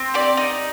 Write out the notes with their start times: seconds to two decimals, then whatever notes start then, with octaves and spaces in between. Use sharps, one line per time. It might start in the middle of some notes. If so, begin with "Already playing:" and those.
Already playing: C4
0.14 G4 D5
0.37 D#4